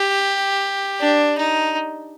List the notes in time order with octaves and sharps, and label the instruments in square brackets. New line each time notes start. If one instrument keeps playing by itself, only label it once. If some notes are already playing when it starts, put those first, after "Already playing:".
Already playing: [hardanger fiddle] G4
D4
D#4